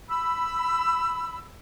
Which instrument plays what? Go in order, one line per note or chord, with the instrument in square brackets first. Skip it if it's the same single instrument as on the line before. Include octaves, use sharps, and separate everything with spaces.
[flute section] B5 E6